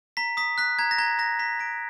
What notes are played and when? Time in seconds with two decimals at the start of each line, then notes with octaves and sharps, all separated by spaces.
0.17 A#5 B6
0.37 D#6 B6
0.58 F#6 B6
0.79 A#5 G#6
0.91 A#6
0.98 A#5 G#6
1.19 A#5 A#6
1.39 A#5 B6
1.60 A#5 D7